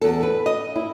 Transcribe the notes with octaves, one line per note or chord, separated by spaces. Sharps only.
E2 A4
B4
D#5
E4